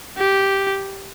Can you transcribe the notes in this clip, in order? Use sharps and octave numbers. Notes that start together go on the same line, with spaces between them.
G4